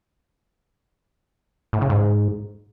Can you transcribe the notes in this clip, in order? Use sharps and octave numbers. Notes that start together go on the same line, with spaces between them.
A2
C#3
G#2